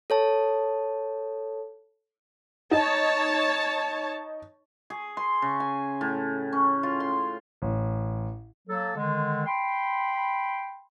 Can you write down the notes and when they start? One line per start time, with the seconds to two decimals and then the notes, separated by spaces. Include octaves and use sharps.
0.10 A4 C#5 A5
2.71 D#4 C#5 A5
4.90 G#4
5.17 C6
5.42 C#3
5.60 G#5
6.01 A2
6.53 C#4
6.83 F4
7.00 C6
7.62 A1
8.68 F#3 A#3 A4
8.96 D3 D#3 G#3
9.46 G5 B5 C6